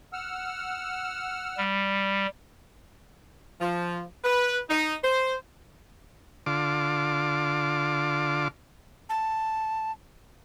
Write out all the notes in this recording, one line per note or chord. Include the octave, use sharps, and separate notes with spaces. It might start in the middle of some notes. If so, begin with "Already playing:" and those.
F#5 E6 F6
G3
F3
B4
D#4
C5
D3 F4 D6
A5